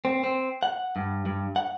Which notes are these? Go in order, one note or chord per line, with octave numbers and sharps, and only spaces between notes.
C4
C4
F#5
G2
G2
F#5